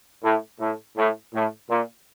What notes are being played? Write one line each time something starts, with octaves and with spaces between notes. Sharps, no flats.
A2
A2
A2
A2
A#2